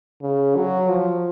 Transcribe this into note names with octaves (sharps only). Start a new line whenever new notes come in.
C#3
F#3
F3